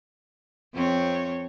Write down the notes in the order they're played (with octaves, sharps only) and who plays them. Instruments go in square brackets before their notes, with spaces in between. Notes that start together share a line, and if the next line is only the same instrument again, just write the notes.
[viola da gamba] F2 C4 C#5